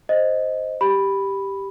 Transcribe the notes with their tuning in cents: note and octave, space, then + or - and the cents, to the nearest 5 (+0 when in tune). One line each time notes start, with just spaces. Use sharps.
C5 +0 D#5 +0
G4 +0 B5 +0